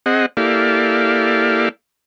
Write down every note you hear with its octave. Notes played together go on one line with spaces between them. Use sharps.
C4 G#4 D#5 F#5
A#3 E4 G4 A4 D5 F5